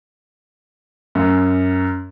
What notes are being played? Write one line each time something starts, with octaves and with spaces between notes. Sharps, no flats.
F#2